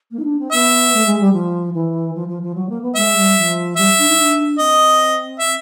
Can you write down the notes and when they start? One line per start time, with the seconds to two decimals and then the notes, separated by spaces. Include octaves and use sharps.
0.11 A#3
0.19 D#4
0.24 D4
0.38 C4
0.52 B3 E5
0.93 A3
1.05 G#3
1.19 G3
1.32 F3
1.73 E3
2.14 F3
2.28 F3
2.42 F3
2.54 F#3
2.69 A#3
2.81 B3
2.96 G#3 E5
3.16 G3
3.37 F3
3.77 G3 E5
3.98 D4
4.08 D#4
4.18 D4
4.59 C4 D#5
5.39 E5